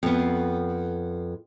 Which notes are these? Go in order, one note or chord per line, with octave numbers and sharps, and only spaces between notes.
F2 B3